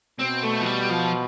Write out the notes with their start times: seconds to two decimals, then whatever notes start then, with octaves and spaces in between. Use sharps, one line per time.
0.19 B2 C4
0.43 A3
0.61 F3
0.66 G3
0.90 F3